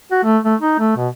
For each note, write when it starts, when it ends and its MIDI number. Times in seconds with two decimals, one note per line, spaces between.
0.11 0.19 66
0.24 0.38 57
0.45 0.55 57
0.61 0.75 63
0.79 0.92 57
0.97 1.08 47